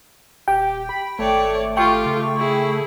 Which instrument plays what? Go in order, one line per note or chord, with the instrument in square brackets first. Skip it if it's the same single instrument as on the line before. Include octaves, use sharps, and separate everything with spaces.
[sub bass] D#1 [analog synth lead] G4 [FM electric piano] G5
[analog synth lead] B5
[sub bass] G#1 [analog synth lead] A3 [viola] C#5 D5
[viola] F4 G4 [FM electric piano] G5 C#6
[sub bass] C#3
[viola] E4 G#4